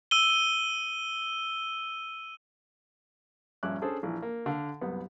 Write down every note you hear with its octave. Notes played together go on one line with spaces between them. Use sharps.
E6 D#7 G7
A#1 G2 C#4 E5 D6 F#6
C#4 D4 G#4 A4 C5
A#1 E3
A#3
D3 A4 F5
C2 F#2 B3